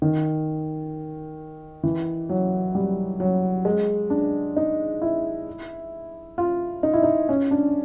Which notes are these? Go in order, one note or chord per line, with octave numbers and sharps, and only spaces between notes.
D#3
E3
F#3
G3
F#3
G#3
D4
D#4
E4
F4
D#4
E4
D#4
C#4
D4